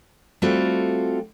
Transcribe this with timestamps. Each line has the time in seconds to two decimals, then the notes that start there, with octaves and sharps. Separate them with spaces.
0.42 G3 A3 C4 F4 F#4 A4